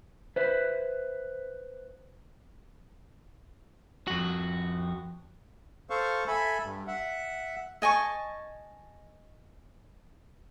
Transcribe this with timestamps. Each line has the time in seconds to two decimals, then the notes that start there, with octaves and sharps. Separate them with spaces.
0.36 B4 C5 E5
4.07 F2 F#4
5.90 A4 C5 F5 C#6
6.28 A4 E5 G#5 B5
6.63 G2
6.87 E5 F#5
7.82 D#5 G#5 A5 C#6